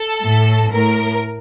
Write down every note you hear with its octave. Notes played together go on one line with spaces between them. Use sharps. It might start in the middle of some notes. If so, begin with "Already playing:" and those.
Already playing: A4
A2
A2 A#4